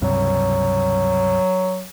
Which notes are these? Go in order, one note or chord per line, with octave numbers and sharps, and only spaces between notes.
C#2 G2 C3 F#3